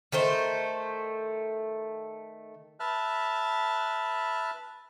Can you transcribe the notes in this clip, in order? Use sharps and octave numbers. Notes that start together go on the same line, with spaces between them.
D#3 A3 C5
B4 E5 A5 F6 F#6